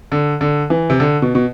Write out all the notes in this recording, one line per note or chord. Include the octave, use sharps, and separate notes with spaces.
D3
D3
E3
C3
D3
B2
B2